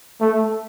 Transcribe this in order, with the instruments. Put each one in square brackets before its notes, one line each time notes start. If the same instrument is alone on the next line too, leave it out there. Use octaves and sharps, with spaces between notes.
[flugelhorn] A3